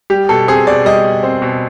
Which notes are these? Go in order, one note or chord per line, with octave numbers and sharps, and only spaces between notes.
G3 G4
B2 A4
C4 G#4
B2 D5
G3 D#5
B2
C4
B2